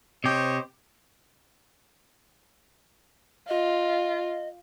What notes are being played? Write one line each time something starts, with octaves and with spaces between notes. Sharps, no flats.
C3 G4 C5 C#5 D#5
F4 D#5